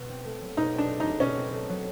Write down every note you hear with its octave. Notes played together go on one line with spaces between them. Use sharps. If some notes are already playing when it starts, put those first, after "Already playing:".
Already playing: B2
C4
A3
F#3
B2 D#4
C4
D4
A3
F#3 D#4
B2 C#4
C4
A3
F#3